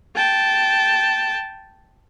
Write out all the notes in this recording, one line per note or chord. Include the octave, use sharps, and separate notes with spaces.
G5 A5